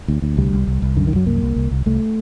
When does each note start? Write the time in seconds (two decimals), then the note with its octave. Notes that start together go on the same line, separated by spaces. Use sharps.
0.08 D2
0.22 D2
0.37 C2 G3
0.53 C2
0.67 C2
0.82 C2
0.97 F#2 D3
1.07 D#3
1.12 F#2 F#3
1.26 C2 A#3
1.42 C2
1.56 C2
1.71 C2
1.86 C2 A3